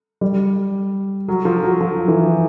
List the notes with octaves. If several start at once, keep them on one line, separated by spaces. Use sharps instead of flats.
G3
F#3
F3
F#3
F3
E3